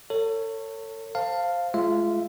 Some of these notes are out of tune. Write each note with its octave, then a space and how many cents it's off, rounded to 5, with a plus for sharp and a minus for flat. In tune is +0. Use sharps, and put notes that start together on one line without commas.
A4 +35 C#5 +0
C5 +0 F5 +0 A5 +20
G#3 +30 F4 -20 E5 +0